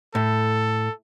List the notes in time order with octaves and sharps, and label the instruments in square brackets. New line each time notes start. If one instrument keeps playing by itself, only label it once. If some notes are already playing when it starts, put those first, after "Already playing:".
[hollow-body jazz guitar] A2 [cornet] A4